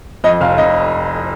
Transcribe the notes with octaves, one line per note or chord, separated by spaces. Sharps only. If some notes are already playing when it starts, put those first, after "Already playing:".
F2 D#5
F1 F5
F1 D#5